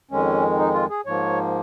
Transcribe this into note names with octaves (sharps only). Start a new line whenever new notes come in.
F2 D#3 G#3 C#4
D#4
F4
G#4
G#2 F3 A#3 C#5